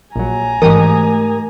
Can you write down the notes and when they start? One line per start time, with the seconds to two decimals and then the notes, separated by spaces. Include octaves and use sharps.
0.16 A#1 F#3 G#5 A#5
0.62 G#2 E3 A3 G4 A#4 D#6